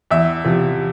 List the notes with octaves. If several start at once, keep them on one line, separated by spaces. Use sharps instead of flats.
E2 E5
C3 F3